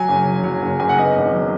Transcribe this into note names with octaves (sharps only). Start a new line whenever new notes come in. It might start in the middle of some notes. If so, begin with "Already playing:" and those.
Already playing: F#3 G#5
F#1
F#3
F#3
F#1
F#1 G#5
F#5
B3 D#5
G#1
F#3